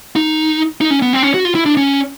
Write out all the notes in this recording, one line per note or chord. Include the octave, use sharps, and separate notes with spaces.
D#4
D#4
C#4
B3
C4
C#4
F#4
F4
E4
D4
C#4